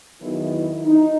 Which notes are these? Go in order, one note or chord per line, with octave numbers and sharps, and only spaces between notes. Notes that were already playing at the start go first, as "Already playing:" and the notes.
E2 D#3 F#3 E4
E4
D#4